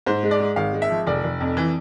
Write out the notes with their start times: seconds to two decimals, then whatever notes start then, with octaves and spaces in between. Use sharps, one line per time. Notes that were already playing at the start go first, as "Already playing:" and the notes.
0.07 G#2 C5
0.23 G#3
0.31 D5
0.40 G#3
0.56 G#1 F5
0.73 G#3
0.82 E5
0.90 F3
1.07 F1 D5
1.24 F1
1.40 F2
1.57 E3